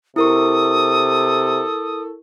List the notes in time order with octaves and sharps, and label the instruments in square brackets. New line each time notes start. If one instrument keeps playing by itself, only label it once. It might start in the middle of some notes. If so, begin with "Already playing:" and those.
[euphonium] C3 [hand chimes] E4 A#4 C#6 [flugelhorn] A4 [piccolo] D#6